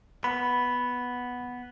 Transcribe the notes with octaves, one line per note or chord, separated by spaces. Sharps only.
B3 B5